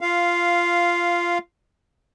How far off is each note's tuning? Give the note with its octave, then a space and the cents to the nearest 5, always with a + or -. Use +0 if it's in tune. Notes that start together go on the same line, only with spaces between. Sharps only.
F4 -10 F5 +0